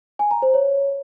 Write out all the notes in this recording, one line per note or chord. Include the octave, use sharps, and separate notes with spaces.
G#5
A#5
C5
C#5